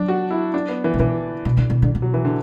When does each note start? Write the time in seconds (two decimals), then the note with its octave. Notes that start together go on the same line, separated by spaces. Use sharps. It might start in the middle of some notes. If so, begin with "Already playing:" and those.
Already playing: F#3 D4
0.08 F#4
0.31 E4
0.54 D4
0.69 B3
0.84 E3
0.94 B2
0.99 D3 E3
1.45 B2
1.57 D3
1.70 B2
1.82 D3
1.95 B2
2.02 F#3
2.14 E3
2.25 D3